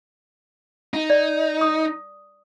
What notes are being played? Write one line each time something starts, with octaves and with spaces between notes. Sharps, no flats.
D#4
D5
D#6